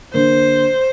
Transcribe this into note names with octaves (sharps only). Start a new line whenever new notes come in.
D3 A#3 C5